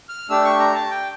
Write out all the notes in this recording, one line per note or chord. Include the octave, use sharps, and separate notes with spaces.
F6
A3 D4 G4 E6
C#6
A#5
A5
G5